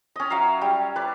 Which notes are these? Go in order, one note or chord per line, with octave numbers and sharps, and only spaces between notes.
C#4 D#5
F#3 E5 F5 A#5
G3
B4 D5